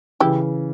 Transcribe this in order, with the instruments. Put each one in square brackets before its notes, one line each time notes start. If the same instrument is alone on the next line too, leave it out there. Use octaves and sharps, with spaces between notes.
[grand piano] C#3 E3 [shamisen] E4 G4